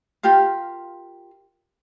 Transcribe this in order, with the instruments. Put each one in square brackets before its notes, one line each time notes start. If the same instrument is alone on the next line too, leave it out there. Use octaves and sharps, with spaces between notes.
[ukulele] F4 G4 A#4 F5